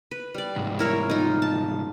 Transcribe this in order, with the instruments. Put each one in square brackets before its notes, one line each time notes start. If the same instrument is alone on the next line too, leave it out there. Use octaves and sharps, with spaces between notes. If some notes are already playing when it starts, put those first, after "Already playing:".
[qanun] B4
G3 D5
[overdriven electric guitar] C2 G#2
[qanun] E4 A#4 C#5
D#4 F4
A5